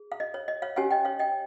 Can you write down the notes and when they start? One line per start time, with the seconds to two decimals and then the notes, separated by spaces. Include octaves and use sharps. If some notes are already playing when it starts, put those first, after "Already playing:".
Already playing: G#4
0.12 F5
0.20 D#5
0.34 C#5
0.48 D#5
0.62 C#5 F5
0.76 C#4 G4 C#5 F5 G#5
0.91 D#5 G5
1.05 C#5 F5
1.19 D#5 G5